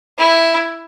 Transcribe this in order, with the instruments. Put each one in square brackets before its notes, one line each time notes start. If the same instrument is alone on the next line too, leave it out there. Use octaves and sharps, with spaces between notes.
[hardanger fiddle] E4